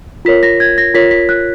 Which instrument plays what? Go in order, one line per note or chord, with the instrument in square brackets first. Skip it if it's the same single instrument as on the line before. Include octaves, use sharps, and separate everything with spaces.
[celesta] F4 A#4 C#5 B6
A#6
G#6
A#6
F4 A#4 C#5 B6
B6
F#6